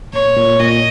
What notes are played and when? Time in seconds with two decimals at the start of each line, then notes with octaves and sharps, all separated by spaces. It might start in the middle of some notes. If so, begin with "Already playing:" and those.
0.13 A#2 C#5
0.37 A#2
0.59 A#2 D#5